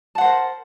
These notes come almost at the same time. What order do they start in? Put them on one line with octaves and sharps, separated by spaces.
A5 F#5 C5 A#4